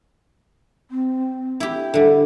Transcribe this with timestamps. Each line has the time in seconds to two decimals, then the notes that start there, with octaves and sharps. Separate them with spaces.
0.91 C4
1.60 E4 G4
1.94 D3 G3 E5